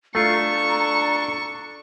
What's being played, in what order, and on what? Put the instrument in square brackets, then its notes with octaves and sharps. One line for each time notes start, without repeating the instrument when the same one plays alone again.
[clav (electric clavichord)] A3 F4 [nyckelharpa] D4 A4 [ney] A#5 [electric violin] C#6